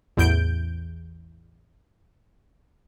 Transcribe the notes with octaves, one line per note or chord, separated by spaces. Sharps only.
A1 E2 G6 D7